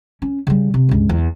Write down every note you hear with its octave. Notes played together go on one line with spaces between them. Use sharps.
C#4
C#3 G3
C3
C#2 G2
E2